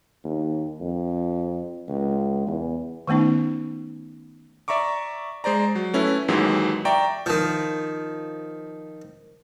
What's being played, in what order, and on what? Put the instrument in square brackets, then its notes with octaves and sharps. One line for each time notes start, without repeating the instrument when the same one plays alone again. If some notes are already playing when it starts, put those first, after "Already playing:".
[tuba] D#2
F2
C#2
E2
[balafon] D#3 A3 B3 C#4 D#4
[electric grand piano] D5 E5 A#5 C#6 D6
G#3 C5 D5 A#5
F#3
A3 C#4 E4 B4
D#2 G#2 E3 F#3 G#3
D5 E5 G5 A#5 C#6 D6
[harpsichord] D#3 F3